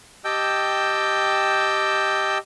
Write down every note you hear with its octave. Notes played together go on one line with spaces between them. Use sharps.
G4 D#5 G5 A5 E6 G6